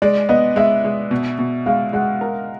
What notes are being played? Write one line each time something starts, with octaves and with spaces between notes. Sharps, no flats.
G#3 D5
B3 D#5
G#3 E5
G#3
B2
B2
G#3 F5
G#3 F#5
A#4